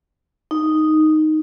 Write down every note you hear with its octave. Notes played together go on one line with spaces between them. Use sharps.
D#4